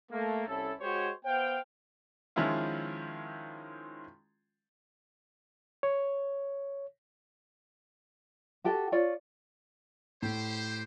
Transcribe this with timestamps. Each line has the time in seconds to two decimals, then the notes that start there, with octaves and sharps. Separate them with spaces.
0.11 A3 A#3
0.47 C2 C#4 E4 A4
0.80 G#3 F#4 G4 C5 C#5
1.25 B3 C5 F5 G5
2.36 D#3 F3 G#3 C#4 E4 F4
5.83 C#5
8.64 F#4 G4 A4 G5
8.92 F4 C#5 D5
10.22 A2 G4 C5